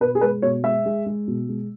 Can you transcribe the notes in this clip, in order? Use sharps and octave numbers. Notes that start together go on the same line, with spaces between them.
B2 B4
G#4
G#3 B4
B2 C#5
G#3 E5
G#3
G#3
B2
G#3